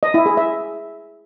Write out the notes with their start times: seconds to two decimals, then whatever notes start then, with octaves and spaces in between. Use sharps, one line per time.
0.03 D#5
0.14 E4
0.26 G#4
0.37 E5